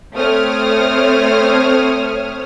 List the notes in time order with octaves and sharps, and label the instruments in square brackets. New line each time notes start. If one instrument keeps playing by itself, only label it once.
[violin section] A3 C4 C5 C#5 D#6 F6